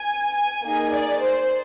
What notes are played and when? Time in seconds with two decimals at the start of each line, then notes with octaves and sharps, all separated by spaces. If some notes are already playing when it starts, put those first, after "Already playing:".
Already playing: G#5
0.34 G#5
0.63 A#3 D#4 G#4 G#5
0.91 D5
1.20 C5